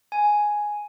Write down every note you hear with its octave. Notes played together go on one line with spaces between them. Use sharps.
G#5